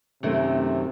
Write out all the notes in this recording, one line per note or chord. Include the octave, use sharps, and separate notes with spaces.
F#2 C3 D#3 A3